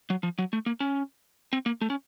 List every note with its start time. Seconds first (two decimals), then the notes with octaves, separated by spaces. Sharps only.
0.10 F#3
0.23 F3
0.39 F#3
0.53 A3
0.66 A#3
0.80 C#4
1.53 C4
1.66 A#3
1.81 A3
1.90 C#4